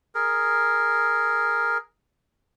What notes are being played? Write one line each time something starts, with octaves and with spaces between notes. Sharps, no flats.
G#4 A#4